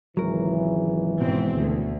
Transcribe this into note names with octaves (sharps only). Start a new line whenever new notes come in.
G#1 C#2 E3 F#3 A#4
G#2 B2 C4
D2